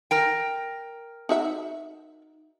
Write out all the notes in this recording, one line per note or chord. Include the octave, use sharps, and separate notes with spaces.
A#4 G5
D#4 F#4 E5